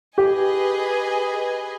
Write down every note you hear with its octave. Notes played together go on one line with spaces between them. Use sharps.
G4 G#4 B4 D#5 G#5